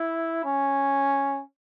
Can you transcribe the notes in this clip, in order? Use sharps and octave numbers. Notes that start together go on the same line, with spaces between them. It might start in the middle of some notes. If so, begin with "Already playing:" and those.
Already playing: E4
C#4